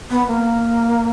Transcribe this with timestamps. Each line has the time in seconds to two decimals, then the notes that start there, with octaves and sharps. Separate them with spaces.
0.11 B3
0.28 A#3